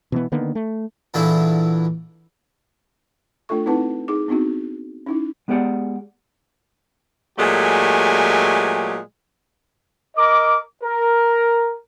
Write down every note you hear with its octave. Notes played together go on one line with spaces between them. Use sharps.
B2 E3 B3
D3 D#3 A#3 B3
A3
E2 A#2 D3 E3 A3 E4
A3 D4 F4 A4 C#6
C4 D#4 E4 B4 F#5 A5
D#4 G#4 D6
B3 C4 D4 D#4 F#4
C#4 D#4 E4
G#3 B3 G4 G#4 D5 F#5
A#2 F#3 G#3 A3 G4 G#5
A#4 D#5 D6
A#4